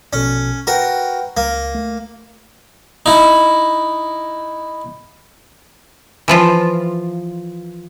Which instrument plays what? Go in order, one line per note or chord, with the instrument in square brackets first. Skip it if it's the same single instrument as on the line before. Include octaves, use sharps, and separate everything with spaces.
[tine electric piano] A#1 B2 A4 [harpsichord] C#4
[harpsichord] F#4 A#4 [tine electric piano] B4 F#5 G5
[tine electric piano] C#2 [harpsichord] A#3
[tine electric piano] A3
[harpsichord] D#4 E4
[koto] E3 F3 F4